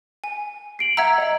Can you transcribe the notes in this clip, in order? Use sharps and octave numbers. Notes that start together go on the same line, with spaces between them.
G#5
C7 D7 F#7
E5 F#5 A#5 E6 G#6
D#5